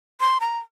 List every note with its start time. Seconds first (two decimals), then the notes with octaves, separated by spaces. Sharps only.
0.20 C6
0.41 A#5